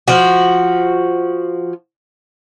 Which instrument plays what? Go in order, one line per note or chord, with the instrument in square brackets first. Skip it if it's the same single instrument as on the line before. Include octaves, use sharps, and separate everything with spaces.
[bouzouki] F3 F#4